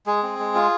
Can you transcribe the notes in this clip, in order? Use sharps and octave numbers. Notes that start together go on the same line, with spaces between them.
G#3 G#4
C4
G#3
F4